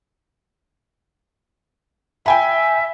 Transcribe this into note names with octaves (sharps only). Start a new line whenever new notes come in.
E5 G5 G#5 B5